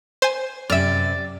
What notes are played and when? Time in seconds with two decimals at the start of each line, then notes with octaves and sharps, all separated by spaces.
0.22 C5 G#5
0.70 F#2 C3 D5 E5 F6